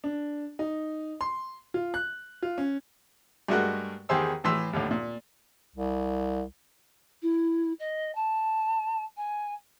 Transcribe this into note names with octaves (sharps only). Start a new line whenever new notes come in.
D4
D#4
C6
F4
F#6
F4
C#4
G2 G#3 A3 F#4 A#4 F#6
E2 D#3 G4 G#4 C5 E6
A2 E3 C6 E6
D#2 A2 D3
A#2
C2
E4
D#5
A5
G#5